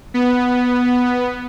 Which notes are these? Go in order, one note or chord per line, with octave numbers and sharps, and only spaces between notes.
B3